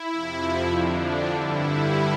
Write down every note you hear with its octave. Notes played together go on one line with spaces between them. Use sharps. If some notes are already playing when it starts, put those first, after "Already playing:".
Already playing: E4
F2 C3 F3
F2 D3 F3 D4
G2 D3 G3 E4